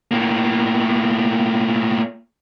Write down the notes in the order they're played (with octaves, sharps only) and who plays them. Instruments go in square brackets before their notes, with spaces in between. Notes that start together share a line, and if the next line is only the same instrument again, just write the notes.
[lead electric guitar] A2 A#3